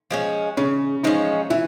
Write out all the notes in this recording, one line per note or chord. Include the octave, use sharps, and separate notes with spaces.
F3 G#3 C#4
C#3 C#4
F3 G#3 C#4 D#4
E3 E4